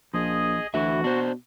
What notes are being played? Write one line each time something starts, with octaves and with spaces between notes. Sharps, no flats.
A#1 F3 G#4 D#5
D2 E3 F#4 E5
B2 D4 C5